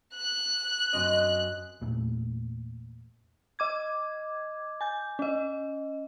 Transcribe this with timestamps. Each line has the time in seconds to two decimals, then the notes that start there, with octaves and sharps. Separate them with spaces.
0.15 F#6
0.93 F#2 C4 D#5
1.81 E2 A#2 A3
3.59 D#5 D6 G#6
4.81 G#5 G6
5.19 C#4 D#5